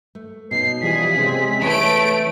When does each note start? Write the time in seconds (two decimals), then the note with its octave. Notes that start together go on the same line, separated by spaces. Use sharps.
0.15 A3
0.51 B2 C#4 D#4 C7
0.82 E3 F3 G3 G#4 B6
1.16 C3 G#3 C4 C#4
1.62 E3 A3 B4 C#5 D7